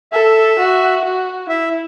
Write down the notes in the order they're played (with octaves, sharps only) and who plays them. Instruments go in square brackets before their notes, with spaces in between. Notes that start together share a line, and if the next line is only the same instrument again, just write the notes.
[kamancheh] A4 [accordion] E5
[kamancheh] F#4
F#4
[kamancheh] E4 [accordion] E5